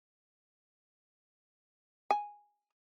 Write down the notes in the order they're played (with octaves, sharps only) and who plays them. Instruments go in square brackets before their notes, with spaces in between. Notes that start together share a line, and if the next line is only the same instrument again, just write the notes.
[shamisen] G#5